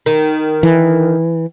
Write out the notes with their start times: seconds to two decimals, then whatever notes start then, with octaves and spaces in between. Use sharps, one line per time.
0.06 D#3
0.63 E3